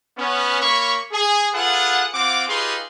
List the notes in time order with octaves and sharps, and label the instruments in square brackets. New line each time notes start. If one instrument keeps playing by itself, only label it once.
[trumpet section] B3 C#4
A#3 C#5 B5 C#6
G#4
F4 G#4 A4 B4 F#5
C4 F4 F#5 D6
D#4 F4 G4 G#4 B4 C6